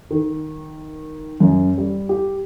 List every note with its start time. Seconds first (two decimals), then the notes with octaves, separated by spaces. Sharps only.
0.11 D#3
1.40 F#2
1.78 G3
2.09 G4